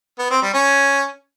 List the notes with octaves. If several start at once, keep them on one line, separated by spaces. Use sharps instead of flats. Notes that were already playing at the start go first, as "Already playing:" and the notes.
B3
C4
G3
C#4